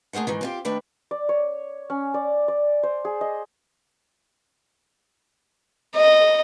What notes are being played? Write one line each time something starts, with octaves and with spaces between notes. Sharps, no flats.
A3 G#4 A#4 C5 F#5
G#2 D#3 E3
C4 F4 G4
D#3 A3 D4 B4 G5
D5
C#5
C#4
D5
D5
C5
G#4
D#5
D#5